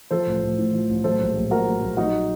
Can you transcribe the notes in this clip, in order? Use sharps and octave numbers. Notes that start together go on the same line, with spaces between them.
F3 A4 C5
A1
A1
A2
F3
A1
F#3 A4 C5
A#1
A#1
A#2 F#4 A#4
F#3
A#1
F#3 D#4 F#4